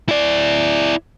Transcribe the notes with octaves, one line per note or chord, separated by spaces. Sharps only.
E4 D5